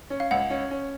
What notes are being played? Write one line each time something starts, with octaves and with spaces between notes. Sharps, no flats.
C#4
F5
C#2 F#5
C#4
C#4